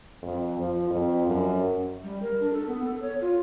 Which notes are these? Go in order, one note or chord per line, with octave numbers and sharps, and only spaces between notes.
F2
F3
F2
F#2
G3
A#4
D4
A4
B3
A4
C#5
F4